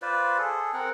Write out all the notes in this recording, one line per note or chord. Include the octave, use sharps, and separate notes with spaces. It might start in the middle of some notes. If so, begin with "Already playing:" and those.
F4 B4 C5 D5
G#4 A4
C4 A#4 F#5